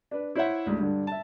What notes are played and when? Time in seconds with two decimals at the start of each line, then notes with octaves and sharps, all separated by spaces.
0.11 D4 B4
0.35 E4 C5 C#5 E5 F#5
0.66 D2 G#2
0.78 G2 D3
1.07 E5 A5